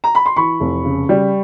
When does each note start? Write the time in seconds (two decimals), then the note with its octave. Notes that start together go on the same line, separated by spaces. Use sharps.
0.04 A#5
0.15 B5
0.26 C6
0.36 E3 B5 C#6
0.60 F1
0.84 C#3
1.09 G3